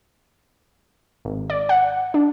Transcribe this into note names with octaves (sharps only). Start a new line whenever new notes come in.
G#1
D5
F#5
D4